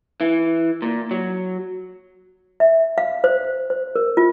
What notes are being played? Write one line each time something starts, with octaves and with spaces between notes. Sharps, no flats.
E3
A#2
F#3
E5
F5
C5
C5
A#4
F4